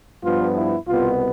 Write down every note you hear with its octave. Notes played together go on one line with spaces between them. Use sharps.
G2 F3 B3 F4
E4
C2 B2 B3 F4